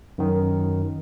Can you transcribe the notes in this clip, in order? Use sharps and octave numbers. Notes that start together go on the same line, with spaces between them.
F#2 D#3